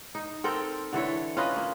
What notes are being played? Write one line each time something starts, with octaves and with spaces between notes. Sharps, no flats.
D#4
C4 A4 A#4 G5
D3 E3 A4 C#5
C#4 F4 B4 D#5
A#3